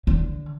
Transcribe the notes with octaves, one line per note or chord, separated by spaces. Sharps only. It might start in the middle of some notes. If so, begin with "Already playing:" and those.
D3